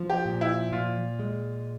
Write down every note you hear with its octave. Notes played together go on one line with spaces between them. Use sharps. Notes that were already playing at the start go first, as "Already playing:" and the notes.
Already playing: F3
G4
A#2
E4
A#2 F4
G#3